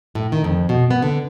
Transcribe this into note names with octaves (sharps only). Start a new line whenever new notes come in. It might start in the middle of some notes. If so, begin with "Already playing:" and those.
A2
D#3
F2
B2
B3
D3